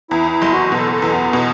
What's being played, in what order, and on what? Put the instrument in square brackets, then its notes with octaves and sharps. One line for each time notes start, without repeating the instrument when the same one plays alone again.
[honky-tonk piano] E2 [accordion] E4
[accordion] E4
[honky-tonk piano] F#1
[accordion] F#4
[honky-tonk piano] B2 [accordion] A4
[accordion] A4
[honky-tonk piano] E2
[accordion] B3
[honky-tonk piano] B2